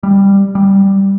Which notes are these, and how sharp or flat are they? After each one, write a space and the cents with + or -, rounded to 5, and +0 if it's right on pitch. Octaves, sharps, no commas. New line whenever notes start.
G3 +10
G3 -5